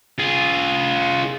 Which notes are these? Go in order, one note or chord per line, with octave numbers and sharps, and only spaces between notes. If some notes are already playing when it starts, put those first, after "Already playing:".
F4 G#4